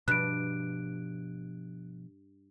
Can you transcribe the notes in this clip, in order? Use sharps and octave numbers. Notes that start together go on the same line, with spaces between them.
G2 B2 F3 F#6 D7